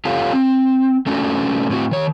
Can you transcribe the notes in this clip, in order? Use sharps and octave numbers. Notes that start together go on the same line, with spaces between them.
F4 G4 A4 C#5 F5
C4
A3 C#4 D4 F#4
A2 C4 F#4
D#3 C#5